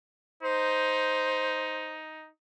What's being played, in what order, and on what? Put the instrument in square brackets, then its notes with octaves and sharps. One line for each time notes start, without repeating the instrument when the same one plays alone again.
[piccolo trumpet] D#4 [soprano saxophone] C5